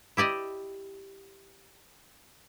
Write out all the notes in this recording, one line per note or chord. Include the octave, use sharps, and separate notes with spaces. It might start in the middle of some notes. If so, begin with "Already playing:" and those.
E4 G4 D5 D#5